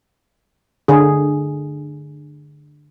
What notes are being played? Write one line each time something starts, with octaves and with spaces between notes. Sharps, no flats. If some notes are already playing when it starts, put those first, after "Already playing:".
D3 G#4